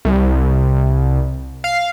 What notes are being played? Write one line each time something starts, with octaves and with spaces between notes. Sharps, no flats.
C2
F5